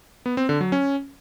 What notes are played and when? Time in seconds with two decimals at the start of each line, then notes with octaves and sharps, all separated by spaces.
0.26 B3
0.37 C4
0.49 D3
0.61 F#3
0.72 C#4